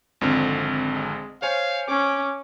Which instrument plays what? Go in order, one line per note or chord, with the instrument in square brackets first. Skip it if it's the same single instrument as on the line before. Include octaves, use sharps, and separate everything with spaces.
[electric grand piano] G#1 F2 D3
[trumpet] G#3
[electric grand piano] C5 C#5 G#5 [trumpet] F5
[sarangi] C#4 [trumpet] D6